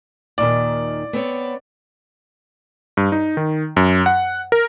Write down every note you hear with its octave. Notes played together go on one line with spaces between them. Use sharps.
D#2 A#2 D#3 D5
B3 C4 C#5
G2
D#4
D#3
F#2
F#5
A#4